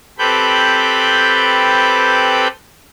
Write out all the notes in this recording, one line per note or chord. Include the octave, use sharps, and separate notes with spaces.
C4 G4 A4 B4 B5 G6